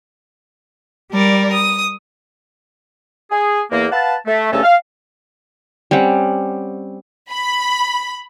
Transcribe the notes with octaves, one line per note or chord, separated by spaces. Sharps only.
G3 A#4 D5
D#6
G#4
E2 A#3
B4 F5 F#5 A5
A3
C2 G2 C#3 A3 C#4 A4
F5
G3 C4 C#4 F#5
B5